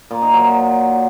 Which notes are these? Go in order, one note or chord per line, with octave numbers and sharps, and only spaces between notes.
A#2
D#4
F#3